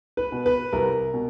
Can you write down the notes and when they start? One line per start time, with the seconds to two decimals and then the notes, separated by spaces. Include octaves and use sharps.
0.17 B4
0.32 B2
0.46 B4
0.73 C2 A#4
1.14 B2